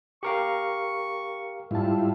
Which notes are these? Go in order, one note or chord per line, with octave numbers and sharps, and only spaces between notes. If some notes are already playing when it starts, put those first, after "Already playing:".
G4 A#4 F5 C#6
G#2 G3 E4 F4 A5